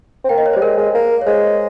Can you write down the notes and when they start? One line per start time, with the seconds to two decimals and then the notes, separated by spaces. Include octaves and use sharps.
0.24 C4
0.29 A#3 G5
0.38 D#5
0.46 C#5
0.53 C5
0.56 G3
0.62 G#3 A#4
0.78 G#3
0.94 A#3
1.22 C#5
1.26 G#3 C5